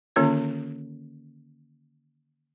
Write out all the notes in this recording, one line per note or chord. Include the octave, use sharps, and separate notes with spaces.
D3 D#3 A#3 C#4 F4 C#5